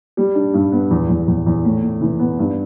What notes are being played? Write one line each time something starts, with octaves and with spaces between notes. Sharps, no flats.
G3
D4
G2
B3
E2
E2
E2
E2
A2
A2
E3
B3
G2